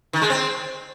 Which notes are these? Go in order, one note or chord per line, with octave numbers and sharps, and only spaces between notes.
D#3
G#3
C4